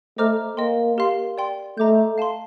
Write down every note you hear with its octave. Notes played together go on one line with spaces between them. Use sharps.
A3 C5 D#5 A#5 D6 F6
A#3 D#5 G5 C6
G4 A#4 F5 C6
D5 G5 C6
A3 D#5 A#5 D6 G6
F5 A5 C6